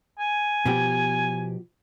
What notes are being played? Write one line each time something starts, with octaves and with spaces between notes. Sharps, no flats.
G#5
B2 F3 G4